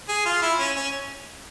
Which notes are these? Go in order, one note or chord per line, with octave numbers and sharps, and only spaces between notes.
G#4
F4
E4
C#4
C#4